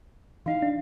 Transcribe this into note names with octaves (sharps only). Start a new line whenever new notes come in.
E3 D#4 F5
D4